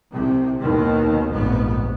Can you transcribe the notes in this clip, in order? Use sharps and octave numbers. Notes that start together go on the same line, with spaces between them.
C2 C3
D#2 B2 D#3
F1 A#1 G#2 B3